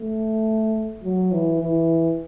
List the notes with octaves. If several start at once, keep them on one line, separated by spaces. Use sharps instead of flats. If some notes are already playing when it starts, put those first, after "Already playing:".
Already playing: A3
F#3
E3
E3